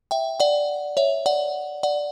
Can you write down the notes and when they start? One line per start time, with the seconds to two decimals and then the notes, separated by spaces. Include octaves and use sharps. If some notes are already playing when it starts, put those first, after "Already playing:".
0.11 E5 G5
0.40 D5 F#5
0.97 C#5 E5
1.26 D5 F#5
1.83 D5 F#5